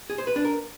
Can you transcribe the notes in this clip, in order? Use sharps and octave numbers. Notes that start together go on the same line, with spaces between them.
G#4
C5
B4
D4
A#4